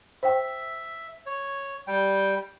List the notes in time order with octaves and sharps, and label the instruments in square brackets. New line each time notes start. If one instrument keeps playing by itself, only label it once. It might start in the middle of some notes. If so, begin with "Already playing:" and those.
[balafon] C5 G5 [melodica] E5
[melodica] C#5
G3 G5